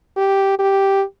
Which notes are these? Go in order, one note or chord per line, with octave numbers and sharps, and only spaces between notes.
G4
G4